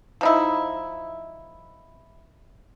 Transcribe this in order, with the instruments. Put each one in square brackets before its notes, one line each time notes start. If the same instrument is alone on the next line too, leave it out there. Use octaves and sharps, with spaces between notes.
[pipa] F3 D#4 E4